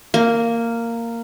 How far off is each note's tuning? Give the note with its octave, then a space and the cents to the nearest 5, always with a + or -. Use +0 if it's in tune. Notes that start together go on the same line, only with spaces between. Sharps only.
A#3 -10